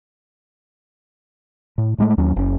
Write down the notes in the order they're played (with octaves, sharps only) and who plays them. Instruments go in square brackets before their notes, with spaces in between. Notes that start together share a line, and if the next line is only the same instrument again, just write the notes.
[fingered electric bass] A2
A2 G#3 A3
D#2 F#3 C#4
F#1 C#4